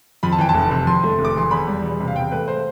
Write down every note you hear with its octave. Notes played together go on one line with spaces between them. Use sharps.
F2 B5
A5
E3 G5
A5
F1
C3
F2 C6
A3
F1
D6
E3 C6
E2 B5
G3
E1
C3
F5
E2 G5
A3 B4
C5